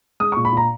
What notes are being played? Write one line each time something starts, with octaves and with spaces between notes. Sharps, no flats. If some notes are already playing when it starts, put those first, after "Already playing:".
G#3 D#6
C#6
A#2
B5
A#2 A#5